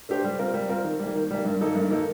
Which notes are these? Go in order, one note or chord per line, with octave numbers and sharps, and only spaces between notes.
A3 D4 G4 C5
G3
C4 F4 A#4
G3
C4 F4 A#4
D#3
G3 A#3
D#3
G3 A#3
G2
D#3 A#3 D#4 A4
G2
D#3 A#3 D#4 A4